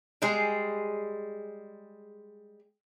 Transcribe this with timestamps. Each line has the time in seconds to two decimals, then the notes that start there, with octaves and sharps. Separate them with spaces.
0.22 G3 G#3 G#4